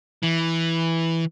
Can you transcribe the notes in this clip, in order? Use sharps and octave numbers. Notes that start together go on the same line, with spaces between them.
E3